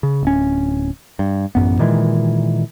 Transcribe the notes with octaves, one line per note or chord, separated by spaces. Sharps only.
C#3
D1 C#4
G2
A1 F#2 B3
A#2 D#3 E3 G#3